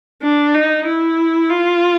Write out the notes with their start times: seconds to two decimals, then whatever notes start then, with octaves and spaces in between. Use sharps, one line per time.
0.22 D4
0.54 D#4
0.86 E4
1.49 F4